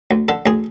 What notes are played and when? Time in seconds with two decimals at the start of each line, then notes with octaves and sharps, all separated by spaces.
0.11 D2
0.28 D3 A4
0.46 D2 G#4